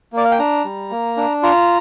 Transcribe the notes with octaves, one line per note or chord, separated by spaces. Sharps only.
A#3 D5
F5
G5
D4 A#5
G3
A#3
D4
F4 A#5